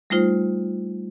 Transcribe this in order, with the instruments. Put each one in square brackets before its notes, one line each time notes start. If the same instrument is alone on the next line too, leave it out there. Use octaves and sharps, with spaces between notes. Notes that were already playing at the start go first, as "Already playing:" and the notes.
[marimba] G3 A3 D#4 F4 C5